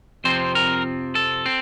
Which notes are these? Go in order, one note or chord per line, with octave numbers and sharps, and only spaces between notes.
F2 C3 F3 C4 C5
A#4
A4
C4